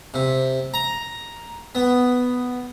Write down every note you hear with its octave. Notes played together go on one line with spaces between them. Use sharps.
C3
A#5
B3